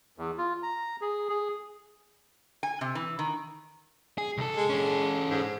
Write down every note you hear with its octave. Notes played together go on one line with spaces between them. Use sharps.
E2
F4
A#5
G#4
G#4
G#5
C3
E3
D#3
G#4
C2 A4
G#3
C#4 A4
G#2